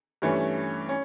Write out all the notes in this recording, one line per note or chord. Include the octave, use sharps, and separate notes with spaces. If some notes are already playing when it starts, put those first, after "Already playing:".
G2 E3 A3 C#4
C#4